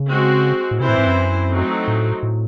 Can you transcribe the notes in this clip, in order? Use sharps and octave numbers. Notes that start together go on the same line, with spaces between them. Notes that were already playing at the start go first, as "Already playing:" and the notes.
Already playing: C#3
G#3 C4 F#4
A2
C3 E3 C4 E4 C5
A2
G#2
F#2
F#3 A3 C4 D#4
A2
A2